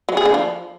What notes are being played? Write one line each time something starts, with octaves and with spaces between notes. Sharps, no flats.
F#3
G#4
D3
F3